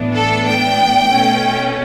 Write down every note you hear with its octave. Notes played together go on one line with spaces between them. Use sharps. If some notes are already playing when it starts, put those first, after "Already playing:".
Already playing: A2 E3 B3 D4
A4
G5
B2 A3 C#4